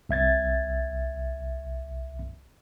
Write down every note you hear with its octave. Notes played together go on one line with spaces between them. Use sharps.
C2 E5 G#6 A6